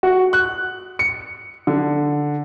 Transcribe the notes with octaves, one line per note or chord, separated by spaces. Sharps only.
F#4
F#6
C#7
D3